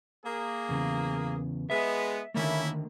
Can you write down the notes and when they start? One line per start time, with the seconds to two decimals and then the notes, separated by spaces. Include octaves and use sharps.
0.24 A#3 G#4
0.69 E2 C#3
1.70 G#3 B3 E5
2.34 D3 D#3 A3 A#3 C#4 E4